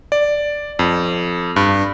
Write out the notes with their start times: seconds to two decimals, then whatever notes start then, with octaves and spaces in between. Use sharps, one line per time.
0.12 D5
0.79 F2
1.56 G2